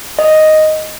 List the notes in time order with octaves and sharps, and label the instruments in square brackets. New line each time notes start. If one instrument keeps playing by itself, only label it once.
[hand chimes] D#5